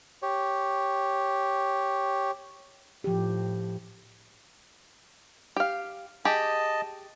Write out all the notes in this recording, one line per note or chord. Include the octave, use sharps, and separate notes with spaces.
G4 C#5
A2 F3 G4
G4 F5
G4 G#4 D#5 A5